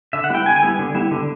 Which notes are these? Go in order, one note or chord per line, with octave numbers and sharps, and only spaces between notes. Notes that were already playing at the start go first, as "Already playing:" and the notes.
D3 E5
F#5
G3 B3 E4 G5
D3 G#5
G#5
G3 B3 E4
D3
G3 B3 E4
D3